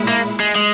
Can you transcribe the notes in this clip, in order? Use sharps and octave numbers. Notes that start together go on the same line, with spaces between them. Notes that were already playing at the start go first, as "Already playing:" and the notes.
Already playing: A#2 G#3 E4
A#3
G#3
G#3